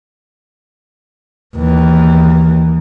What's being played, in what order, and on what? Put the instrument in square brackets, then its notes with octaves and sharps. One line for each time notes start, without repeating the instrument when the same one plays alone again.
[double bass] D#2 E3